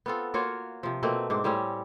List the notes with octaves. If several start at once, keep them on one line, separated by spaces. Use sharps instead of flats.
B3 C4 F4 A4
A#3 F4 F#4 C#5
C3 F3
B2 A3 A#3 C4
G#2 C4 D4
A2 G3 C4 C#4